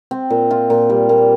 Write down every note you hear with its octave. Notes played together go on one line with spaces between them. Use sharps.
C4
A#2
F4
A#2
G3
A#2